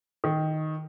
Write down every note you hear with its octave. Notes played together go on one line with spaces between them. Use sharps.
D#3